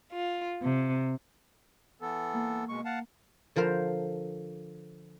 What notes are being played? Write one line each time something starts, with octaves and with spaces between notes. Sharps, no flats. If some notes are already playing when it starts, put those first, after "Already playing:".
F4
C3
E3 B3 A4
A#3
B2 G#3 C#6
F5 F#5 A5
D3 F3 A#4 C5